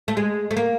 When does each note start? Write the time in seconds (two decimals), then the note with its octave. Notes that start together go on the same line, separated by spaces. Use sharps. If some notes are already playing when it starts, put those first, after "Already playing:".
0.08 A3
0.17 G#3
0.51 A3
0.57 A#3